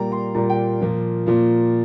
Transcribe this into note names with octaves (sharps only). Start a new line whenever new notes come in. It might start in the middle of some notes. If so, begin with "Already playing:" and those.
Already playing: A#2 G3 A#3 A#5
C6
A#2 G3 A#3 A#5
G5
A#2 F3 A#3
A#2 F3 A#3